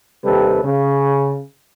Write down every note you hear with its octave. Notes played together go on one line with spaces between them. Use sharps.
D#2 C3 G3 A4 B4
C#3